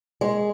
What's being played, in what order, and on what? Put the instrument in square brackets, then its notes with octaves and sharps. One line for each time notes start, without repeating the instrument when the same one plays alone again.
[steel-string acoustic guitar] G#3